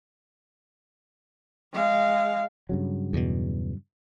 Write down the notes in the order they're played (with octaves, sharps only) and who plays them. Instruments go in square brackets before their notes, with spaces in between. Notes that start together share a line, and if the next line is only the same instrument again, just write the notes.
[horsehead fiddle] G#3 F5
[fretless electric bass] G2 C#3 F#3
[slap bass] E2 B2